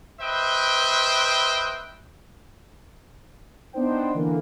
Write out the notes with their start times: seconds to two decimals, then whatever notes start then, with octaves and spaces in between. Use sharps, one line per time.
0.21 B4 C5 D#5 E5 G5
3.73 B3 D4 D#4 C5 G5
4.14 D3 E3 A#3